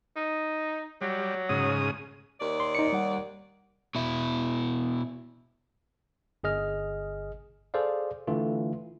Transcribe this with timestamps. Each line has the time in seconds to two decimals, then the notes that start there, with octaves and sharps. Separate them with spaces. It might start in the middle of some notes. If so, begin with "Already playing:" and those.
0.16 D#4
1.01 F#3 G3
1.49 G#2 C#3 D#6
2.41 D#2 D5
2.60 C6
2.75 D#4 C#7
2.93 G3 F#5
3.95 B2 E4
6.44 G1 G#4 D#5 F6
7.74 G#4 A4 C5 D5 F5
8.27 D3 E3 A3 F4